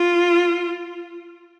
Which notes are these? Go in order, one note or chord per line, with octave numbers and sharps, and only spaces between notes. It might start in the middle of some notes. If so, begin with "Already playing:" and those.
Already playing: F4